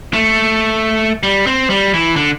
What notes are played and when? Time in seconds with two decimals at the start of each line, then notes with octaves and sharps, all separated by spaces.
0.13 A3
1.23 G3
1.47 C4
1.70 G3
1.94 E3
2.16 D3